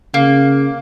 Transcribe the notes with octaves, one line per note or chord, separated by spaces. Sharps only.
C#3 A#3